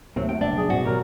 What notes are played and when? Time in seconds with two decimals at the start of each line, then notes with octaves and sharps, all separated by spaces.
0.16 D#2 C3 F#3 A3 C4
0.29 F#2 F#5 G5
0.41 F#1 C2 B2 D4
0.57 G#4
0.70 G#2 B2 C4 F#4
0.85 F#3 G3 A#4